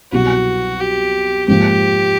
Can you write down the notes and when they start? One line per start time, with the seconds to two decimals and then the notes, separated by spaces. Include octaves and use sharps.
0.12 C2 B2 F#3 F#4
0.80 G4
1.48 G#2 F3 A#3 G4